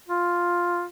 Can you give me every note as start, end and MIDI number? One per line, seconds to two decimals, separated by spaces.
0.09 0.85 65